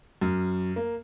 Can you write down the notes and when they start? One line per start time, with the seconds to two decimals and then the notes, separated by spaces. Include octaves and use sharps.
0.21 F#2
0.76 A#3